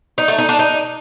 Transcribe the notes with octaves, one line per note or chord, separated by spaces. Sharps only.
D#4
A3
D#4
D4
D#4